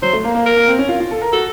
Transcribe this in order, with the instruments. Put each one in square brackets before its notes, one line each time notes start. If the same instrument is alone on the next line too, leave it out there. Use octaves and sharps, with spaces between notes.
[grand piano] F#3 [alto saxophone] C5
[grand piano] A3
A#3
A#3
[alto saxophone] A#4
[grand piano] A#3
C4
C#4
F4
F4
A4
A#4
[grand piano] F#4 [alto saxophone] A4